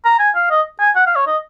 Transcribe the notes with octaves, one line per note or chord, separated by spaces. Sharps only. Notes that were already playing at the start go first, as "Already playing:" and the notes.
A#5
G#5
F5
D#5
G#5
F#5
F5
C#5
D#5